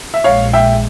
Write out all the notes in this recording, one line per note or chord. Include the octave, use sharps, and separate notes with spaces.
E5
A#1 A#2 G#3 C#5 F5
E5 G5